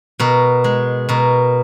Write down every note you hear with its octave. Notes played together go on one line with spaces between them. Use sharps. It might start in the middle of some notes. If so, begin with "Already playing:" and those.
B2 A#4
G#3
B2 A#4